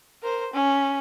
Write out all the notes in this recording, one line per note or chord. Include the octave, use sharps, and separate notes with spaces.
A#4 C5
C#4